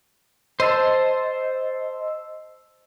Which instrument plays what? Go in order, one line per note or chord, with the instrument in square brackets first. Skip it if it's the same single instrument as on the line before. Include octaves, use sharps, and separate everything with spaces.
[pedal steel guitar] C5 A5 [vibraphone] D#5 E6